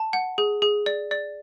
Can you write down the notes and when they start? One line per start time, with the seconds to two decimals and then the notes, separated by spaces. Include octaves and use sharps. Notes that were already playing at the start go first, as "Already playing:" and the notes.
Already playing: A5
0.13 F#5
0.38 G#4
0.62 G#4
0.86 D5
1.11 D5